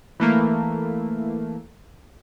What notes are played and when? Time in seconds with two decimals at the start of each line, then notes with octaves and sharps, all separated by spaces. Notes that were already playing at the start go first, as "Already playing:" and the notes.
0.20 E3 A3 A#3